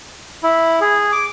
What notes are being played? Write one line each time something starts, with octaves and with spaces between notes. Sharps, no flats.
E4
G#4
D6